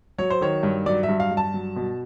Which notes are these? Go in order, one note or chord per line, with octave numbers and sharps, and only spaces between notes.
F#3 C#5
C5
D#3 C#5
G2
F#3 D5
E5
G2
F5
G2
A5
F#3
B2